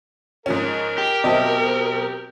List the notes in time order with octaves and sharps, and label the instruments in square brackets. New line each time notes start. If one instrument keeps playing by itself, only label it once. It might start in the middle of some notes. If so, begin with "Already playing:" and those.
[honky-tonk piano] G#2 F3 C#4 [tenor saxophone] A#4
[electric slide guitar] G4
[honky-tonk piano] B2 F#3 C4 [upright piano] D#5 E5 A5